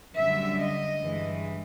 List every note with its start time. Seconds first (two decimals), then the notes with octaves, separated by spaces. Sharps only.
0.15 F#2 D3 G3 E5
0.58 D#5
1.01 G2 E3 G#3